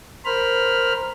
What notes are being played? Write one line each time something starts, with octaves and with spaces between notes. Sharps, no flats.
A#4 C5 B5 F6